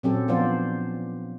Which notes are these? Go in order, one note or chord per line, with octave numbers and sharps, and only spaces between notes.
A#2 F#3 C4 C#4 G4 A4
F3 B3 D4 F4 C5 D5